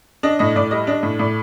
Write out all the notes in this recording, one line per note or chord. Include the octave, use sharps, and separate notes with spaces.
D4 D#5
A2 D#5
A2 D5
G3 D#5
D4 D#5
A2
A2 D5